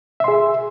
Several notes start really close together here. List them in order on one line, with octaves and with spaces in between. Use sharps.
E5 C6 G#4